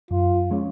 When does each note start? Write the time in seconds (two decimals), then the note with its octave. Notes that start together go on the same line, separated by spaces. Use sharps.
0.11 F#2 F4
0.50 F3 G#3 C#4